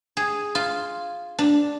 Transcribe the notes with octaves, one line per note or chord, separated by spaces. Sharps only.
G#4
F4
D4